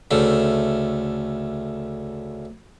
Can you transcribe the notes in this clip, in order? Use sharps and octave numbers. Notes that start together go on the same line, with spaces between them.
D2 C#3 A3